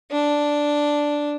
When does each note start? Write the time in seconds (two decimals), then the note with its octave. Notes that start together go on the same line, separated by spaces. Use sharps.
0.11 D4